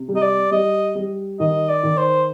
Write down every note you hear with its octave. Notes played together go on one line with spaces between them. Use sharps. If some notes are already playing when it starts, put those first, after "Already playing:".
Already playing: C3
G3
D#5
D5
G3 D#5
G3
D#3 D#5
D5
D#3
C5